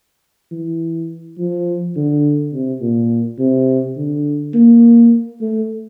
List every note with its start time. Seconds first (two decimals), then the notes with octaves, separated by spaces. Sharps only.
0.51 E3
1.38 F3
1.96 D3
2.53 C3
2.81 A#2
3.39 C3
3.97 D3
4.54 A#3
5.41 A3